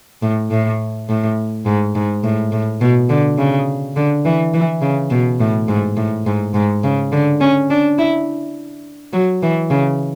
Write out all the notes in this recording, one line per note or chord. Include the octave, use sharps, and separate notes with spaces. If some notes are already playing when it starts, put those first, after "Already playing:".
A2
A2
A2
G#2
G#2
A2
A2
B2
D3
C#3
D3
E3
E3
C#3
B2
A2
G#2
A2
G#2
G#2
C#3
D3
C#4
D4
E4
F#3
E3
C#3